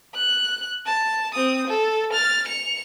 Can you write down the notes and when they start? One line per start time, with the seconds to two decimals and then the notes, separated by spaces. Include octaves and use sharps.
0.15 F#6
0.86 A5
1.35 C4 D#6
1.67 A4
2.13 F6 A6
2.47 C#7 F7